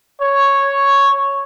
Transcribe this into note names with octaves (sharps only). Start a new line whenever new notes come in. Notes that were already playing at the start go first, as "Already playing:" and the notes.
C#5